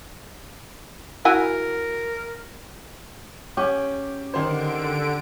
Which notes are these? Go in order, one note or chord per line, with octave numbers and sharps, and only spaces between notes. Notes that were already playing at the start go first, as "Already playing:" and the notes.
E4 F#4 A#4 G#5
C#4 G4
D3 D#3 C5 D7